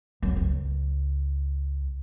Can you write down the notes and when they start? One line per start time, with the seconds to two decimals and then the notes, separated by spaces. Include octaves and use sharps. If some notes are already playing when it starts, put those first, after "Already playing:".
0.22 F#2
0.36 C#2